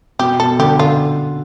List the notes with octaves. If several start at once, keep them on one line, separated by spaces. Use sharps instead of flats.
B2 G4
B2 A4
D3 G4
D3 F4